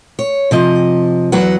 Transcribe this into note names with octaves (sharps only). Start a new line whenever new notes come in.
C#5
C3 F3 D#5
E2 F#3 B4 F#5